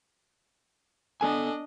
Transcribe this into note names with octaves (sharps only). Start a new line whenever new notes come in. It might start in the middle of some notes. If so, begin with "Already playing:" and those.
B3 D4 A4 D#5 G#5